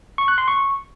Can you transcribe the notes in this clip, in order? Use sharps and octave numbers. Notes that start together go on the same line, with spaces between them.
C#6
F#6
C6
C#6